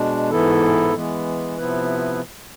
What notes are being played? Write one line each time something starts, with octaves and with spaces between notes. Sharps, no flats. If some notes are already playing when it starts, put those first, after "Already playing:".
Already playing: B2 G#3 D4
G#2 E3 B3 E4 A4
E3 G#3 B3
C3 F3 B3 E4 B4